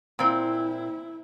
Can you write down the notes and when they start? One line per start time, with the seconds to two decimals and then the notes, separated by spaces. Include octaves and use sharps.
0.19 A#2 C4 E4